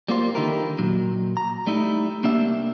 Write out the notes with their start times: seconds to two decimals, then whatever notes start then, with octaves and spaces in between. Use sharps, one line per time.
0.08 G3 A#3 F4 C5
0.35 D3 D#3 D#4 E4 G4 A#4
0.78 A#2 F#3
1.37 A#5
1.67 G3 A3 D#4 E4
2.24 C2 A#3 D4 G4 E5